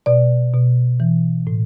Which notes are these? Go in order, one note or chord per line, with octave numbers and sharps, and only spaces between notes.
B2 D5
B2
E3
A2